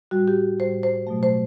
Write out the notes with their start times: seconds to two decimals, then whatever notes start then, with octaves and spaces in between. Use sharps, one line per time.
0.11 A2 G3 F#4
0.28 G4
0.59 A2 G3 C5
0.83 C5
1.07 B2 F#3 A3
1.23 C5